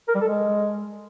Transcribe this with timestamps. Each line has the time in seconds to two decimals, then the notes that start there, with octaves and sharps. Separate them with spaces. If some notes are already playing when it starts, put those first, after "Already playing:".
0.08 A#4
0.15 G3
0.21 A4
0.28 G#3